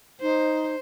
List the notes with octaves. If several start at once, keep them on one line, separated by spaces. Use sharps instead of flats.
D#4 C5